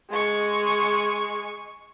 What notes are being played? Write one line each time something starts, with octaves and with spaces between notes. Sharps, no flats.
G#3 C#6